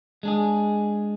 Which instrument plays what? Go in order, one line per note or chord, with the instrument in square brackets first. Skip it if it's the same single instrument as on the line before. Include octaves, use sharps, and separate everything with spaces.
[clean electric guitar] G#3 D4 G#4